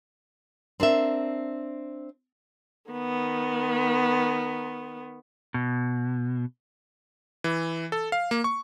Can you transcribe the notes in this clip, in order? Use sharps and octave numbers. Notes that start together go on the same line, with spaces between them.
C4 D4 A#4 E5
D#3 B3
B2
E3
A4
F5
A#3
C#6